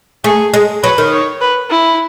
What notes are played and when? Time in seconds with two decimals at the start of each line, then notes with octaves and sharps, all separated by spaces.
0.24 A3 G#4
0.54 G#3
0.83 F#3 B4
0.98 D#3
1.12 C#5
1.41 B4
1.70 E4